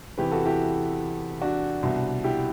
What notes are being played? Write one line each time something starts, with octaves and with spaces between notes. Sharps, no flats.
E2 C3 E3 G4 B4
F#4 A4
E4 G4
D4 F#4
C2 B2
E4 G4